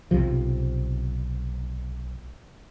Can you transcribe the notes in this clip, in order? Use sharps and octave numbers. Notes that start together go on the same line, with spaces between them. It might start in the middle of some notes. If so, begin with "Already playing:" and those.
B1 C3 F3